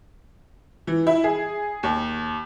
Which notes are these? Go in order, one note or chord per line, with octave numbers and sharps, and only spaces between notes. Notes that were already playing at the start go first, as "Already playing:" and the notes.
E3
E4
G#4
D#2